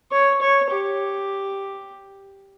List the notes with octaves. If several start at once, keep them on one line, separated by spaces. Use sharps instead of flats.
C#5
C#5
G4